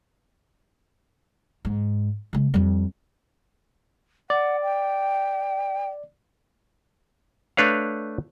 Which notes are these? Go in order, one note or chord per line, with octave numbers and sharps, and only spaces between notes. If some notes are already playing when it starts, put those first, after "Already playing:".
G#2
C#3 G#3
F2 G3
D5 F#5
G5
A3 D4 B4 C#5 F5